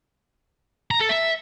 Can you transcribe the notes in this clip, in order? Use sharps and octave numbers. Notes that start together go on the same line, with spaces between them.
A#5
A4
E5